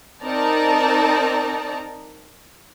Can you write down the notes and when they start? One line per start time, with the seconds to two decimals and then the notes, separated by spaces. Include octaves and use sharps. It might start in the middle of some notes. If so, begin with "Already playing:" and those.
0.23 C4 D#4 A#4 D5 A5 A#5